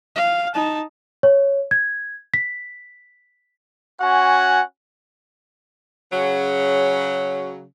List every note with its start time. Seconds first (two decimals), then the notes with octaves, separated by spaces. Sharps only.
0.16 F5
0.55 D#4 A5
1.23 C#5
1.71 G#6
2.34 B6
4.00 C#4 F#4 F#5 G#5
6.12 C#3 F#3